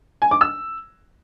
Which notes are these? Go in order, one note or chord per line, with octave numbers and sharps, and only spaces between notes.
G#5
D6
E6